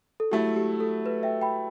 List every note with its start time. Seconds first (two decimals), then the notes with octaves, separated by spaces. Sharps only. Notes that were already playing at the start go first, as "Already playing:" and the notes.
0.20 A4
0.32 F#3 A3 E4 G4
0.56 G4
0.80 A4
1.06 B4
1.23 E5 G5
1.41 G5 B5